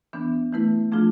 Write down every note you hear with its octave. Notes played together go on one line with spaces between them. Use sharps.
E3 B3 D4
E3 A3 E4 B4
F3 A3 D4 F4 G#4